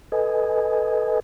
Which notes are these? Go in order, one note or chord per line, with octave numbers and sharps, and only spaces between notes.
A4 B4 D#5 G#5